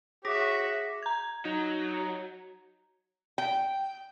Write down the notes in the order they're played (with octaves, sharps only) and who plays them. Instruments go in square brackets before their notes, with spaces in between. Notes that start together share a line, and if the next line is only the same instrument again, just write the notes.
[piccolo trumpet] F#4 [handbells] G#4 [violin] C#5 E5 [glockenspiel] D6 A#6 B6
[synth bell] A#5 G#6
[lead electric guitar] F#3 [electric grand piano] D#4
[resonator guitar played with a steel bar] G5